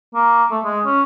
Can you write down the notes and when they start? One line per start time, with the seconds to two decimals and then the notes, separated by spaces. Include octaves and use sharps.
0.15 A#3
0.51 A3
0.64 G#3
0.86 C#4